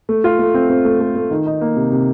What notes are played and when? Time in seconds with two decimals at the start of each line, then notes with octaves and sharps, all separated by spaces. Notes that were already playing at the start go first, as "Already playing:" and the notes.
0.09 A3
0.24 F4
0.39 A3
0.54 C4
0.70 C4
0.85 A3
1.01 A3
1.15 A3
1.31 D#3
1.46 D#4
1.61 A#3
1.77 C3
1.92 C3